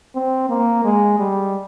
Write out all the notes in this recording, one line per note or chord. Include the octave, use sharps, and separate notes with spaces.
C4
A#3
G#3
G3